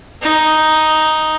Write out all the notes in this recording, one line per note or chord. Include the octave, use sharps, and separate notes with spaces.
D#4